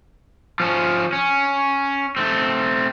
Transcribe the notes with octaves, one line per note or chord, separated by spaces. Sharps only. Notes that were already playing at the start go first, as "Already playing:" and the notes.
F3 C#4
C#4
A3 C4